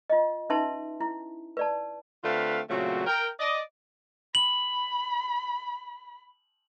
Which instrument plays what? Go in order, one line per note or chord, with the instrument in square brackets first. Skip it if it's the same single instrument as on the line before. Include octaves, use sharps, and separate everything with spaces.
[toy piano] F4 D#5
C#4 D#4 B4 E5 A5 C6
E4
B4 D5 A5
[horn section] D3 A3 C4 F4 B4 F5
A#2 C#3 F#3 A3 C4 F#4
A#4 G5
D5 D#5
[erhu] B5 [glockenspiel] F#7